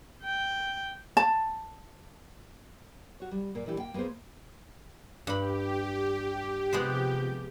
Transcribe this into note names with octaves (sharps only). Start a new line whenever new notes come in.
G5
A5
F#4 C#5
G3
A#2 A#3
A#2 E3 D4 E4 G4
A#3 G5
A#3 B3 F4 G#4 C5
G2 G4 B5
C3 F3 G#3 B3 C5 G6